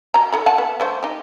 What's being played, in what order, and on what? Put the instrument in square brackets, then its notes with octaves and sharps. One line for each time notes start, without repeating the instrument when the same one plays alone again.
[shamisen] F#3 A#5
D#3 A4 B5
F#5 A5
B3
D3 A3 C5
D#4 G4